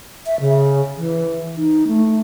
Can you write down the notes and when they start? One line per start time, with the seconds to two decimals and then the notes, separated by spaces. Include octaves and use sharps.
0.26 E5
0.40 C#3
0.97 E3
1.57 D#4
1.88 A3